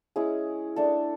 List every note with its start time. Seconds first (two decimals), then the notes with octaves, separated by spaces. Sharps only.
0.16 G#3 C#4 E4 G#4
0.76 A3 D4 A4